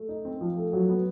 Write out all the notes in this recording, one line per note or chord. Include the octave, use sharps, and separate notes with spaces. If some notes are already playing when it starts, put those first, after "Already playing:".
Already playing: A3
D#4
C4
F3
A3
F#3
B3